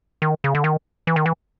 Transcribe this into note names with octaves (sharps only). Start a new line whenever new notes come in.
D#3
C#3
D3
D#3
E3
D#3
E3